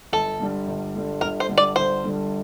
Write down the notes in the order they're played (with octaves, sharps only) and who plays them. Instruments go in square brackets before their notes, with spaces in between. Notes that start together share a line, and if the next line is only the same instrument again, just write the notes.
[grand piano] G1 [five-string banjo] A4
[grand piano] G2 D3 G3
G1
G2 D3 G3
[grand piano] G1 [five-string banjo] A#4
[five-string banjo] C5
[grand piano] G2 D3 G3
[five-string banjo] D5
[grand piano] G1 [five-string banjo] C5
[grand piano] G2 D3 G3